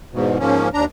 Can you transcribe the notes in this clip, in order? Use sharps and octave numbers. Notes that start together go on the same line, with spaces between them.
E2 G#2 B2
G#2 F3 A#3 C#4
D#2 D4 A#5